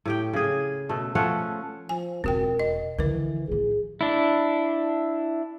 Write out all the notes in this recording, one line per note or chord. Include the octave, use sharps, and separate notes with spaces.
A2 G4 G5
C#3 G#4
B2 A3
F3 A3 C#4 F#5
F3 G#5
E1 C4 F#4 A#4 G5
D#5
D3 E3 F3 A#4 B4
A1 F3 G#4
D4 E4